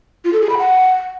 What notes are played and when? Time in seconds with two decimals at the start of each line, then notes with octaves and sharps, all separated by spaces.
0.25 F4
0.33 A4
0.41 G#4
0.49 B5
0.58 F#5